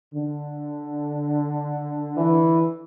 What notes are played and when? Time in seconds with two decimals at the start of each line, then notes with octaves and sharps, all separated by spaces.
0.13 D3
2.17 E3